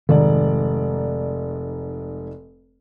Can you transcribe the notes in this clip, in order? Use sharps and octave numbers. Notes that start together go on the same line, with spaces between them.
F1 G#2 D#3 D5